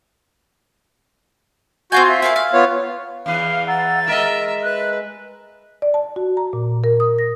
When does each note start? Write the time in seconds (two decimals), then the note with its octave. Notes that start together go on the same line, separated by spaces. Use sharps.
1.92 C4 F4 F#4 G#5 G6
2.09 E5
2.22 E4 A#4 F5
2.36 F5
2.53 B3 F4 C#5
3.26 E2 E3 B4 F5
3.68 F#5 A#5 E6 A6
4.08 G#3 A#4 D#5 E5
4.63 B4 F#6
5.82 D5
5.94 A5
6.16 F#4
6.37 A#5
6.53 A#2
6.84 A#4
7.00 D#6
7.19 A#6